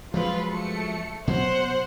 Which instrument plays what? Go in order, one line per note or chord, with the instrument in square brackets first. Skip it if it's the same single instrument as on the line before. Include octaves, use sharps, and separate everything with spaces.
[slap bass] F3 F#3 G#3 [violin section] F4 B4
[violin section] A3 C#7
[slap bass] B2 F#3 [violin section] C5 F#5